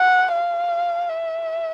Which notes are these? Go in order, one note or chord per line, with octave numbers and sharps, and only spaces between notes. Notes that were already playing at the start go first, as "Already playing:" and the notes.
Already playing: F#5
F5
E5